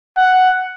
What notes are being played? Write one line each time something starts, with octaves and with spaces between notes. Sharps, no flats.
F#5